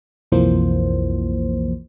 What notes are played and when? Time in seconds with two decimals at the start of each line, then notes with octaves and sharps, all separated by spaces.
0.32 B1 F2 E3 F3 A#3 C5